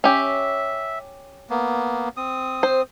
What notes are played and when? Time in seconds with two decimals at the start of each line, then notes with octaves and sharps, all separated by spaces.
0.04 C#4 G4 E5
1.50 A#3 B3
2.17 C4 D#6
2.63 C5